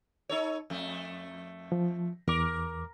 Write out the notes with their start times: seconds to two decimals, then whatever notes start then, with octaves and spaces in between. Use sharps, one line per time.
0.29 D#4 A4 C#5
0.70 F2 A3
1.72 F3
2.28 E2 A#4 D6